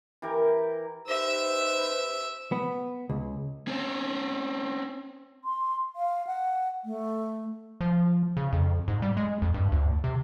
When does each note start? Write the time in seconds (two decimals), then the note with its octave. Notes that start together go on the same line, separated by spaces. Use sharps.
0.22 E3 G4 A#4
1.08 D#4 G4 B4 C5 E5 E6
2.52 B3
3.09 C#2
3.68 C4 C#4
5.45 C6
5.96 F5
6.27 F#5
6.85 A3
7.81 F3
8.37 C#3
8.53 F2
8.88 G#2
9.02 G3
9.17 G#3
9.42 F2
9.54 G2
9.72 D2
10.04 C3